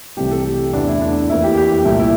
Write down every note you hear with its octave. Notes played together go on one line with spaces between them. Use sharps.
C2 C3 E3 A3 G4
A4
G4
E2 D3 A3 D4
E4
D4
F2 E3 A#3 E4
G4
G4
G4
C2 A#2 A3 E4
E4